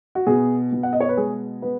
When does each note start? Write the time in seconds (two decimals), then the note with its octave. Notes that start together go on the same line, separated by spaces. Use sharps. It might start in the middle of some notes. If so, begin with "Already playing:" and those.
0.15 F#4
0.27 B2 G#4
0.72 B2
0.83 F#5
0.93 D#5
1.00 C#5
1.09 B4
1.17 G#3 G#4
1.62 B3 B4